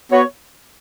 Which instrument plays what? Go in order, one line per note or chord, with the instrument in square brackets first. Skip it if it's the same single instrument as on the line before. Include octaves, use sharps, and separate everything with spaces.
[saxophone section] B3 F#4 C#5